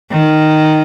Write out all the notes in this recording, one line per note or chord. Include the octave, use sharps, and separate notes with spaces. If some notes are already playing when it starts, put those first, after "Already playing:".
D#3